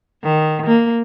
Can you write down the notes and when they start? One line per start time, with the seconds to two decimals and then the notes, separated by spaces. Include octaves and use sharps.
0.24 D#3
0.67 A#3